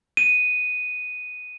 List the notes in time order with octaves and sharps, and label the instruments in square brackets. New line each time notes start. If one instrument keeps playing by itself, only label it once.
[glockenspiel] D#7